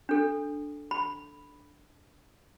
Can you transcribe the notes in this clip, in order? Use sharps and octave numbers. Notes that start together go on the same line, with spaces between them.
D4 A4
B5